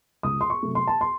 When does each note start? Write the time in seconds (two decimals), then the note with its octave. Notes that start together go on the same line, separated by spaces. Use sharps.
0.23 C#2 D#6
0.41 C6
0.50 C#6
0.63 C3 F#3 A3
0.75 C6
0.87 A5
1.01 C6